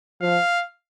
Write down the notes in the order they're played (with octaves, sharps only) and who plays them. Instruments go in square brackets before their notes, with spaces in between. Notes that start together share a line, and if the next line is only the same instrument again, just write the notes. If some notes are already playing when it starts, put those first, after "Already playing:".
[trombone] F3 [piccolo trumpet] F5